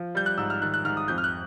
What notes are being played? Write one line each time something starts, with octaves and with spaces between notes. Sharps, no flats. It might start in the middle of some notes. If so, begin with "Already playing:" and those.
Already playing: F3
G3 G6
F#6
G#2 E6
F6
D#3 F#6
F#6
G#2 F6
D#6
F2 G6
F6
F#6